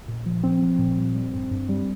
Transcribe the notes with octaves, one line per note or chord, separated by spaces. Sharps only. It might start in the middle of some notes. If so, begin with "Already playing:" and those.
A#2
F3
F3 C4
F3
A#2
G3
G3
G2
G2
G3